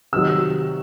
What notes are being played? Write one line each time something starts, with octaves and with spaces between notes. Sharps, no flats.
C3 D#3 F#3 E6